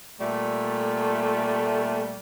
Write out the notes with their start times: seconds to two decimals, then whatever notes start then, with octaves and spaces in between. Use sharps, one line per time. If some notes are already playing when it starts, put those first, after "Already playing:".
0.20 A#2 G3 A3